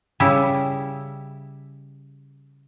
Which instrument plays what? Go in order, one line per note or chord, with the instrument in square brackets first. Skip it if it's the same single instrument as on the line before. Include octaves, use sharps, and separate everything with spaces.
[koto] C#3 G3 E4